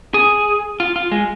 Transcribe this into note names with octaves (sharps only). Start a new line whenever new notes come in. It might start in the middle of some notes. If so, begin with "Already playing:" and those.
G#4
F4
F4
G#3